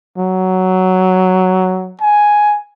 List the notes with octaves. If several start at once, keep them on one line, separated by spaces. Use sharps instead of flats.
F#3
G#5